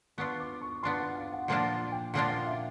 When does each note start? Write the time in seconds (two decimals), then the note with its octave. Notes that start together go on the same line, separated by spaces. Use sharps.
0.18 B3 D4 F4 C#6
0.40 D6
0.61 C#6
0.83 B3 D4 F4 C6
1.00 F#5
1.15 F5
1.32 F#5
1.48 A#2 F3 A#3 D4 F4 F#5
1.92 G5
2.14 A#2 F3 A#3 D4 F4 F#5
2.30 F5
2.47 E5